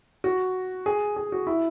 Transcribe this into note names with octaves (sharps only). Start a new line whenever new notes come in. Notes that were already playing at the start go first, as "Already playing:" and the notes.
F#4
G#4
G#4
F#4
E4